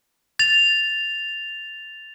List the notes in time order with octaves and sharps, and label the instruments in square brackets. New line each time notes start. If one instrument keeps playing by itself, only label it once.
[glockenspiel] A6 F7